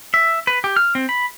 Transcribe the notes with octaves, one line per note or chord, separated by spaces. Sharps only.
E5
B4
G4
F6
C4
B5